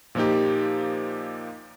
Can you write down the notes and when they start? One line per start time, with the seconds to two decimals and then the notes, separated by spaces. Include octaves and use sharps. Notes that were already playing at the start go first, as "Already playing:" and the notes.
0.15 A#2 F3 A#3 D#4 G4